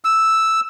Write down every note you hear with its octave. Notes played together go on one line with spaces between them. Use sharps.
E6